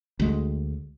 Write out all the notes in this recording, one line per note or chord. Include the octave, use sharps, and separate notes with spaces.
D2 G#3